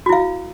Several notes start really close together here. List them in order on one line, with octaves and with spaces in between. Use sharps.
F#4 E4 F5